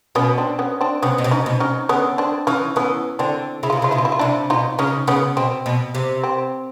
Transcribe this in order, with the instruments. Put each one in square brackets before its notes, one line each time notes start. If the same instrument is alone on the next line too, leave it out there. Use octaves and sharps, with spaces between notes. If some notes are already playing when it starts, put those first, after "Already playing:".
[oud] B2 [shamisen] B3 C#4
[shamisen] C4 D4
B3 C#4
C4 D4
[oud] C3 [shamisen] B3 C#4
[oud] B2
C3
[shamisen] C#4 D#4
[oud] B2
[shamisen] C#4 D#4
[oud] D3 [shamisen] B3 C#4
[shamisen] C4 D4
[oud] E3 [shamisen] C#4 D#4
[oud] E3 [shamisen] B3 C#4
[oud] D3 [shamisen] C4 D4
[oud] C#3 [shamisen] E4
[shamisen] F4
[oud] C3
[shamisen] E4
[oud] C#3 [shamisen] F4
[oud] B2 [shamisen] E4
[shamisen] F4
E4
F4
[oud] C3 [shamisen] D4 E4
[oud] B2 [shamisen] D#4 F4
[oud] C#3 [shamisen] C#4 D#4
[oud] C#3 [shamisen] B3 C#4
[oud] B2 [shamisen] C4
[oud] B2
C3
[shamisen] C4